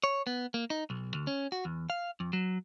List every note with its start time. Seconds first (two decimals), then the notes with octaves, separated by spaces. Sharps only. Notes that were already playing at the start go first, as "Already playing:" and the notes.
0.04 C#5
0.27 B3
0.54 A#3
0.70 D#4
0.90 B1
1.14 D2
1.27 C#4
1.52 F#4
1.65 E2
1.90 F5
2.20 F2
2.33 F#3